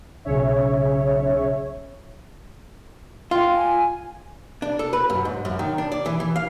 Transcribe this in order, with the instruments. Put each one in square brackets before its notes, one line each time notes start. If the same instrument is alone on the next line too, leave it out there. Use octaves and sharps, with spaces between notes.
[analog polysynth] B1 C#3 C#4 C#5 E5
[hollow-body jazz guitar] F4 [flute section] G5
[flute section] G#5
[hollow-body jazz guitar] D4
A4
B4
F#2
G#2
F#2
D#3
D4
D5
E3
E3
F5